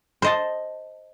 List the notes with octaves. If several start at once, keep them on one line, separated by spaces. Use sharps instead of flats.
C5 D#5 A5